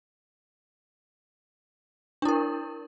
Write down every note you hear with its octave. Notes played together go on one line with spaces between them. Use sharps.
D4 E4 A#4